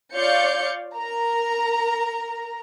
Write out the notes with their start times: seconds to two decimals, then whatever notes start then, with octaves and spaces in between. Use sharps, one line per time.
0.14 F4 C#5 D5 F5 G6 C#7
0.95 A#4 A#5